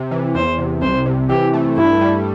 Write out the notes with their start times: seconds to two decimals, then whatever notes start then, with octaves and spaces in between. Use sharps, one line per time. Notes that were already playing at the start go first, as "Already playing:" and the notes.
Already playing: C3
0.11 E3
0.35 E2 C5
0.59 C3
0.82 C2 C5
1.06 C3
1.29 E3 G4
1.53 A3
1.77 G2 E4
2.01 G3